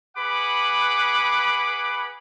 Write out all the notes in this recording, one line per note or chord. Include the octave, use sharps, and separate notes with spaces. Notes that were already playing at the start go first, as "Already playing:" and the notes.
G#4 B4 F#5 B5 D6